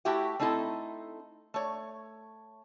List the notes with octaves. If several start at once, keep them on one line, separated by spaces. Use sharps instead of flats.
A3 E4 F#4 G4 E5 G5
A3 C4 D#4 E4 A4
A3 C#5